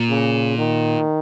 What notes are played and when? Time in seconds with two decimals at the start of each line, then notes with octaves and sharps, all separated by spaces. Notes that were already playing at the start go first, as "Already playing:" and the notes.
Already playing: A#2
0.10 C#3
0.58 D#3